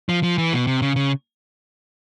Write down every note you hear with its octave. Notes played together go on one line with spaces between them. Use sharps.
F3
F3
E3
B2
C3
C#3
C#3